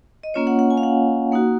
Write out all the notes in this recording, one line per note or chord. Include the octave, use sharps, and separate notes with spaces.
D#5
A#3 C#4 F4 C#5
F#5
F#5
G#5
F5
F#5
A#3 D#4 F#4